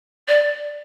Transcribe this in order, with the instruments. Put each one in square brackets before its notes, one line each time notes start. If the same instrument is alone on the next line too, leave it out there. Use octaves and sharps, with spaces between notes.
[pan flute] D5